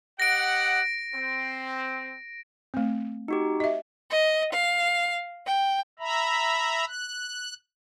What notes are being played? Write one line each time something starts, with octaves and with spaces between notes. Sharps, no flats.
G4 D#5 F#5 A#6 D7
C4
A3 C4
D#4 F#4 G4
D#5 E5
D#5
F5
G5
E5 A#5 B5
F#6